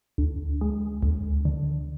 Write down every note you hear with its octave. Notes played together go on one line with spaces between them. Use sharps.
D2
G#3
D2
D3